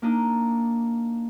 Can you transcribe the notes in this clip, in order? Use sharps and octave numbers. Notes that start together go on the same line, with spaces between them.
A#3 D4 D#4